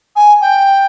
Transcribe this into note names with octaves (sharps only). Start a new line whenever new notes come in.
G#5
G5